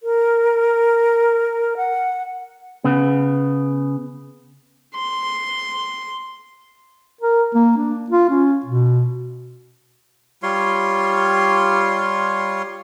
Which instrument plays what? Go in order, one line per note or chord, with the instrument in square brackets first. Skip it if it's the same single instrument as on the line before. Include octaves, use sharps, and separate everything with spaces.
[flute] A#4
F#5
[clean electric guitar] C#3 B3
[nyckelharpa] C6
[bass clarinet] A#4
A#3
D4
F4
C#4
B2
[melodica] G3 F4 C#5 C6